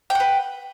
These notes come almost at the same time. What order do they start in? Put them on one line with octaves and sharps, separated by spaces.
G5 F#5 B4